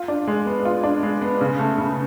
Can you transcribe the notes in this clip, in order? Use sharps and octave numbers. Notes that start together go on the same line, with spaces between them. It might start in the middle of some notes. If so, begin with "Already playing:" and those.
Already playing: F4
D4
G#3
B3
F4
D4
G#3
B3
C#3
A3
C#3